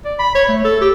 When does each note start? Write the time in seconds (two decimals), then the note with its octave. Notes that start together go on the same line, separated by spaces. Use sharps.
0.05 D5
0.19 B5
0.35 C#5
0.48 A3
0.65 A4
0.81 G4